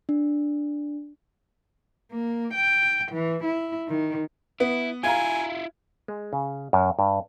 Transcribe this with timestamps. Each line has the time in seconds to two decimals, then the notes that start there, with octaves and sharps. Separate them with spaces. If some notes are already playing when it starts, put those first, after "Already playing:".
0.09 D4
2.12 A#3
2.54 G5
3.12 E3
3.44 E4
3.88 D#3
4.60 B3 E4
5.04 E4 F4 E5 F5 G#5 A#5 G#6
6.08 G#3
6.33 C#3
6.73 F#2
6.99 G2